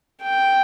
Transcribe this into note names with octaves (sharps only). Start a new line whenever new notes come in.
G5